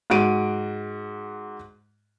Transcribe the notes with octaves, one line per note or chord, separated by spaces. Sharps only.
G#2 F#4 D7 D#7